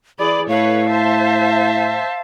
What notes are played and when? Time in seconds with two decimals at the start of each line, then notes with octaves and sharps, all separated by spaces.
0.19 E3 G#4 D5 B5
0.49 A2 A4 B4 C#5 F5
0.90 C5 E5 A5